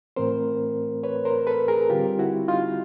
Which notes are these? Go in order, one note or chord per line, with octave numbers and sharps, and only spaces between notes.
A2 E3 A3 C4 A#4 C5
B4 C#5
A#4 C5
A4 B4
G#4 A#4
D3 G3 C4 F4 G4
E4 F#4
D#4 F4